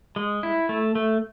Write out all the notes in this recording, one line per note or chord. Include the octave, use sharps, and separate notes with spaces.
G#3
E4
A3
A3